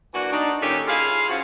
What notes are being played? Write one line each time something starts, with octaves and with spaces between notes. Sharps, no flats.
E3 A#3 D4 F#4
D4 D#4
A#2 D#3 C#4 G4 A4 F5
E4 F4 G#4 F5
F3 C#4 F4 F#4